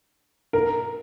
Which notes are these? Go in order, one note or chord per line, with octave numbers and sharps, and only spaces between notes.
A#4